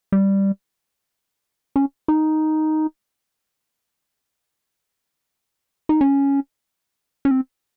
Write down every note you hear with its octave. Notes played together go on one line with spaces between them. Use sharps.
G3
C#4
D#4
D#4
C#4
C#4
C4